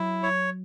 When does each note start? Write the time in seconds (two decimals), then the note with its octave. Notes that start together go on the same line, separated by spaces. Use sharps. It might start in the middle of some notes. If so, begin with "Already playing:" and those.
Already playing: F#3 E4
0.23 C#5